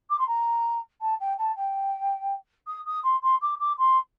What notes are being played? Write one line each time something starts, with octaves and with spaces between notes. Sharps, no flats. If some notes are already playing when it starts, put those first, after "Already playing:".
D6
C6
A#5
A5
G5
A5
G5
D#6
D#6
C6
C6
D6
D6
C6